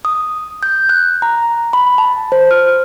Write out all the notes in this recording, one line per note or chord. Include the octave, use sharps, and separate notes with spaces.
D#6
G6
F#6
A#5
B5
A5
C5
F6